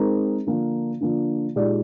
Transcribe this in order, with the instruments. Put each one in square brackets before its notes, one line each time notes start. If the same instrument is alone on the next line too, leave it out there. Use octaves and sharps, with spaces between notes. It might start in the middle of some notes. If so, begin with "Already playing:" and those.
Already playing: [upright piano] G#3 C4 D#4 A#4
D3 F3 A#3 D4
D3 F3 A#3 D4
A#2 G#3 D#4 G4 D5